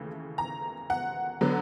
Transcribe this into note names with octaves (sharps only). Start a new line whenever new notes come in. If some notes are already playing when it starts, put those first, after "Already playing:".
Already playing: D#2 C#3 E3 A3
A#5
F#5
D3 F#3 B3